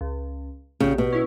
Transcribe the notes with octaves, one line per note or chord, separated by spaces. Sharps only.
C#2
A#1 C#3 G4
B2
C#4 E4